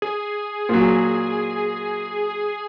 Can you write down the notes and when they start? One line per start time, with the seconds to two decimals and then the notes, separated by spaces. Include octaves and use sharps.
0.02 G#4
0.69 A#2 F#3